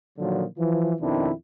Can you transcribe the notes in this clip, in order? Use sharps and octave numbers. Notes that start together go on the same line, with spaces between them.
A#2 D3 D#3 F3 F#3
E3 F3
F2 B2 D#3 C4 D4 E4